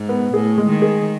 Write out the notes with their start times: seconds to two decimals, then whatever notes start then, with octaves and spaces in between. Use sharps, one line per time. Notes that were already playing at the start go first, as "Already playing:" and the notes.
Already playing: G#2
0.09 B3
0.34 A2 G#4
0.58 G#3
0.69 D#3
0.82 G#4